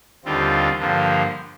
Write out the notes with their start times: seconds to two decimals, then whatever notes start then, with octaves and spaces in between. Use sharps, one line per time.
0.25 D#2 D3 G3 C4 F4
0.79 G2 D3 F3 A#3